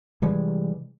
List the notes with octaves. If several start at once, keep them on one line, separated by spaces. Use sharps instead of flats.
C3 E3 G3 G#3